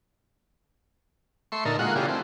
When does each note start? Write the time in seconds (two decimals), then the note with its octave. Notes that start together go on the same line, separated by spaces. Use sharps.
1.52 A3 E5 C6 C#6
1.65 A#2 D3 D#4 A4 A#4
1.79 G#3 A#3 F4 F#4 F#5
1.96 C#3 E3 D4 F4 G4 G#4
2.08 A3 C4